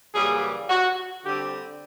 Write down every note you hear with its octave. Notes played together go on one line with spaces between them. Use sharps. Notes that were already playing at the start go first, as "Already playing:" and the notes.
F#2 C#3 E3 G3 A#3 G#4
F#4
D3 G3 C4 G4